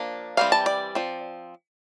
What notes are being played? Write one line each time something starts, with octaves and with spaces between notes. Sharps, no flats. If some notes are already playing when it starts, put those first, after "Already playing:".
Already playing: F3 A#3 D4
E3 G3 C4 F5
A5
D5
F3 C4